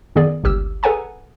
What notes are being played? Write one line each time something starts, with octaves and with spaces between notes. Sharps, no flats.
F#2 D#3 B3 G#4 D5
G1 C#2 G4 E6
G#4 A4 B4 F#5 G#5 A#5